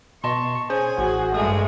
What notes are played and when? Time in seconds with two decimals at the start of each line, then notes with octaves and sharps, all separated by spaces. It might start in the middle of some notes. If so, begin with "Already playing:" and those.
0.24 B2 D#5 A5 C6 C#6
0.70 C#4 G#4 C5 G#5
0.98 A1 F#4 G#4
1.34 G2 G#3 A3 G#4 D#6